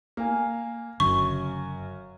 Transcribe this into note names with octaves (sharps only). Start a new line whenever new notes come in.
A#3 F5 G#5
F#1 F#2 D3 C#6